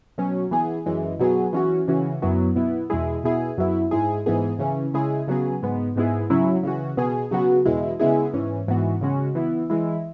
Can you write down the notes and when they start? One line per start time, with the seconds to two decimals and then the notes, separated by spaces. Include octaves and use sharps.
0.18 B2 F#3 C#4
0.51 E3 B3 G#4
0.86 F#2 E3 G#3
1.19 B2 F#3 B3 G#4
1.53 E3 C#4 F#4
1.88 C#3 E3 C#4 F#4
2.22 F#2 F#3 B3 E4
2.55 B2 B3 E4
2.90 E2 B2 G#3 E4 G#4
3.24 B2 B3 E4 G#4
3.58 F#2 F#3 B3 E4
3.91 G#2 G#3 E4 G#4
4.26 G#2 E3 B3 G#4
4.59 C#3 E3 C#4
4.94 C#3 G#3 E4 G#4
5.28 C#3 F#3 B3 G#4
5.62 G#2 G#3 B3
5.96 G#2 G#3 B3 E4 G#4
6.30 C#3 F#3 C#4 E4
6.63 C#3 E3 C#4 F#4
6.97 B2 B3 G#4
7.31 C#3 F#3 B3 F#4
7.65 E2 B2 G#3 E4
8.00 C#3 G#3 B3 E4 G#4
8.33 G#2 E3 C#4
8.68 G#2 E3 B3 F#4
9.01 C#3 G#3 C#4 F#4
9.35 E3 B3 E4
9.70 E3 G#3 E4